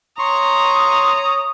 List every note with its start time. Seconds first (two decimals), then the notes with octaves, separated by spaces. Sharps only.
0.19 C#5 A#5 C6 C#6 D#6